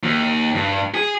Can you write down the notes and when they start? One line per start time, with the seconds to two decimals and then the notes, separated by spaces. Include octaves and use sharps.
0.03 D#2
0.55 G2
0.94 G#4